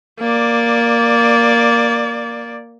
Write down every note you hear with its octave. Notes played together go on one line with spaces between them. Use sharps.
A#3 D5